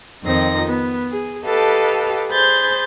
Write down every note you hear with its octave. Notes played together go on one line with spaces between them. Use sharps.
F2 D#3 F3 C4 D#4 A#6
B3
G#4
G4 A4 B4 D#5 F5 A5
G#4 C5 B5 G6 A6